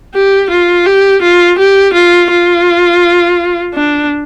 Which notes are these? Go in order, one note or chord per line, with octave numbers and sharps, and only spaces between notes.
G4
F4
G4
F4
G4
F4
F4
D4